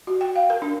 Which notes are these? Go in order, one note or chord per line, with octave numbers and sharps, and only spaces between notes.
F#4
G5
F5
A#4
D4